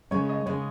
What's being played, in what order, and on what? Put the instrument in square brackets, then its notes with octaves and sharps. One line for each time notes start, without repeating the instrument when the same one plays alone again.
[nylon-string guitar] C#3 G#3 C#4 [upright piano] C#5
[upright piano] D#5
[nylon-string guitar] C#3 G#3 C#4 [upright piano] C#5